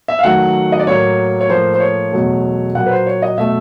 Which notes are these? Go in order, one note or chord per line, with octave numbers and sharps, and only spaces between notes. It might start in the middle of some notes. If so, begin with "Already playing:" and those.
E5
F5
D#2 D#3 F#3 A3 F#5
D#5
D5
A2 F#3 A#3 C#5
C#5
A2 F3 A#3 C5
C5
C#5
E2 B2 F#3 A3
A#2 F#3 A#3 F#5
B4
C5
C#5
D#5
B2 F#3 A3 E5